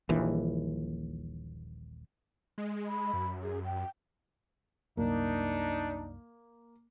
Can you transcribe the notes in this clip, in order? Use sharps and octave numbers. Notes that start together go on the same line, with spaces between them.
D#1 A#1 D#2 E3
G#3
B5
F#2
G#4
G5
C2 F#2 A#3 D4 D#4